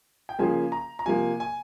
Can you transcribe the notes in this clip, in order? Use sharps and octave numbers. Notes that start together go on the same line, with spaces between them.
G5
C#3 F3 A#3 G#5
A#5
A#5
C3 F3 A#3 G#5
G#5